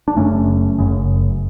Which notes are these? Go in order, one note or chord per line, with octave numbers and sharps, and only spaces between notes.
D4
F#1 F#2 C#3 A3 C#4
F#1 F#2 C#3